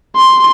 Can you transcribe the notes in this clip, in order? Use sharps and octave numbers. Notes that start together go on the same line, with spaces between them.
C6